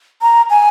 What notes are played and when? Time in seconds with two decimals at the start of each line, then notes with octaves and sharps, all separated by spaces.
0.22 A#5
0.50 G#5